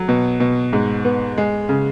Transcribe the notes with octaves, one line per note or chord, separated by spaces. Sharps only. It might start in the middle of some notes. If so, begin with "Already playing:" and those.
Already playing: F#3
B2
B2
G#2
B3
G#3
C#3